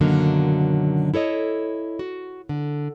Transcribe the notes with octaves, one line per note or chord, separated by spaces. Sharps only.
F#2 B2 D3 D#3 F#3 A#3
E4 A4 C#5 D#5
F#4
D3